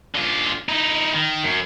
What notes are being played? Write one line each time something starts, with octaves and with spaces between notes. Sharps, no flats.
D3 F4
D#4 E4
D#3
F#2